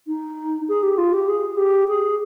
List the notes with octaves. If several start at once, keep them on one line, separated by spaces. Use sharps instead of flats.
D#4
G#4
G4
F4
G4
G#4
G4
G#4